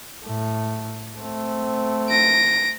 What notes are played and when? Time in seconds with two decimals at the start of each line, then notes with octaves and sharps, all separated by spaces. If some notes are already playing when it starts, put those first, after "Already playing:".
0.25 A2 A3
1.19 A3 C4
2.09 A#6 D7